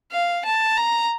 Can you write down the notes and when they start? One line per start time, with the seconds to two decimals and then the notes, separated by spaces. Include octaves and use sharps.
0.12 F5
0.45 A5
0.77 A#5